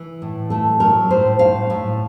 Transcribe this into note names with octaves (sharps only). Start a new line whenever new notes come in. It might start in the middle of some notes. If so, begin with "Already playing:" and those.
Already playing: E3
A2
A3 A4
F#3 A#4
A2 C5
A2 F5
A2